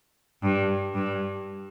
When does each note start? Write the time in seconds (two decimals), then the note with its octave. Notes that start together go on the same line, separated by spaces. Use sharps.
0.43 G2
0.94 G2